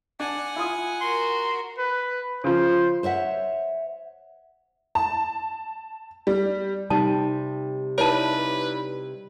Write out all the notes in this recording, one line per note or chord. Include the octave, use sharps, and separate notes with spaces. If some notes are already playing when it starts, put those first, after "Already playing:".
D4 F#5 G#5
E4 F4 D#6
F#4 A#4 C6
B4
C#3 F3 C5
C5 C#5 E5 F#5
A5
G3
C3 G3 D#4 A5
D#4 E4 B4 C#5 D5 A5